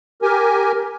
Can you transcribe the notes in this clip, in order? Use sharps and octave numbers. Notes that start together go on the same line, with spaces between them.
G4 A#4 G#5